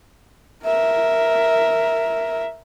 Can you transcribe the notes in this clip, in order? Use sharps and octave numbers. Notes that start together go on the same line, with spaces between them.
A#4 E5